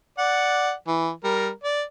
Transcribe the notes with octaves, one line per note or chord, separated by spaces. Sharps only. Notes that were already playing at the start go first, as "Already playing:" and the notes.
D5 F#5
E3
G3 A#4
D5